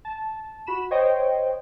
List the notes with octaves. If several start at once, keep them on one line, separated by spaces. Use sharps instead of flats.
A5
F#4 B5 E7
C5 C#5 D#5 G5